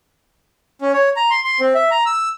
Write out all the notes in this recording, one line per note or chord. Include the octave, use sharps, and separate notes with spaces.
C#4
C#5
A#5
C6
C6
C4
E5
A#5
E6